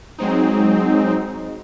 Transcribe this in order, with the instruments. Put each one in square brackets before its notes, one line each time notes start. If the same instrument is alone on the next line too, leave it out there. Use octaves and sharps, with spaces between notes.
[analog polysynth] F#3 G#3 C4 D#4